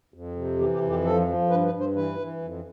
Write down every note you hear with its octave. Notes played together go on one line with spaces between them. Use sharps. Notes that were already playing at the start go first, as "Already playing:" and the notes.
F2
C3
E3 G4
G4
F2
G4
F3 A4
F3
G2 B4
B4
G2
C5
E3 B4
E3
F2